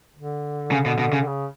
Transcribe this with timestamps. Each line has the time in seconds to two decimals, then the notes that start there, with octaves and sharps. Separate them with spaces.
0.16 D3
0.72 C#3
0.86 B2
0.99 B2
1.13 C#3
1.20 D3
1.27 C#3